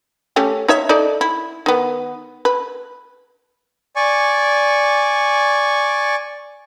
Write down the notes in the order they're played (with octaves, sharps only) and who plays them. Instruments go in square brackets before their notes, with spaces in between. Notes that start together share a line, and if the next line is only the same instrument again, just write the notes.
[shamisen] A3 C#4 G4
D#4 C#5 E5
D#4 A4 D5
E4
D#3 B3
B4
[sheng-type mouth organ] D5 G#5 C#6